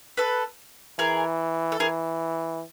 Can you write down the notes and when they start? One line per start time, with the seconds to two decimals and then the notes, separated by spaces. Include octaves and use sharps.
0.17 A4 B4
0.99 E3 G#4 A#4
1.72 A4
1.79 E3 G#4 A#4